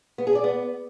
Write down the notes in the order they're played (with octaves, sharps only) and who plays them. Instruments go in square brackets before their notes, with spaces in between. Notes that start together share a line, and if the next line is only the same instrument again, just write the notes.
[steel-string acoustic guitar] B3
G#4
D5
B3